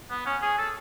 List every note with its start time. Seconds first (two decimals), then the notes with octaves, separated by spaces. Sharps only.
0.10 B3
0.26 C#4
0.42 G#4
0.58 A4